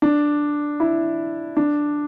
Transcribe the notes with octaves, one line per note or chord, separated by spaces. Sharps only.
D4
E4
D4